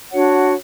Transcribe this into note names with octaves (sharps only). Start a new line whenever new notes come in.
D4 F#4 C#5 F#5